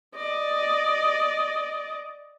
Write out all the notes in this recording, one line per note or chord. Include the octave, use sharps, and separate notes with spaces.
D5 D#5